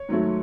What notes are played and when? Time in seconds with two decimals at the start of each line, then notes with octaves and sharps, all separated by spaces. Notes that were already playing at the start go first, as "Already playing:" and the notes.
Already playing: C#5
0.09 G#2 D#3 F#3 A3